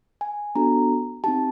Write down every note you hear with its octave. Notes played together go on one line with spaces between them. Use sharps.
G#5
B3 D4 F#4 A4 A#5
C4 D#4 G4 A5